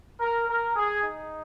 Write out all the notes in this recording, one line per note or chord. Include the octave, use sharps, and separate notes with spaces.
A#4
A#4
G#4
D#4